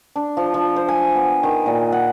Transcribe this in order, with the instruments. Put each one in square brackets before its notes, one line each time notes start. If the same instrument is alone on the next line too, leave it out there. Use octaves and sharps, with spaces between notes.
[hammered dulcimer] D4
F3
F3
C5
G#5
B3
D#3
A#2
F#5